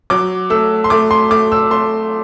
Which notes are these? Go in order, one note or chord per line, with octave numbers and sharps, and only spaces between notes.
F#3 D6
A3 E6
C6
A3 D6
C6
A3 D6
E6
A3 C6